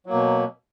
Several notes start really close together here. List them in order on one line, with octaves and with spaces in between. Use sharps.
F#3 A#3 B2